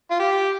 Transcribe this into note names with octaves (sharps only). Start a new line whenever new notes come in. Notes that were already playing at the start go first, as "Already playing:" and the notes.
F4
G4